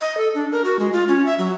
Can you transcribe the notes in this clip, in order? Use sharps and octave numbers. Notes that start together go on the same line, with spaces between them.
D#5
A4
D4
A#4
F#4
G#3
F4
C#4
E5
F#3